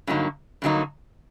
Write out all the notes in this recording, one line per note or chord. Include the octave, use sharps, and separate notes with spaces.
G2 D3 F#3 A#3 D#4
G2 D3 F#3 A#3 D#4